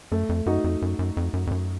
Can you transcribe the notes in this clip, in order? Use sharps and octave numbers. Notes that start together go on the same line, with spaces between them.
F#2 A3
F2
F#2 D#4 F#4
F2
F#2
F#2
F2
F#2
F2
F#2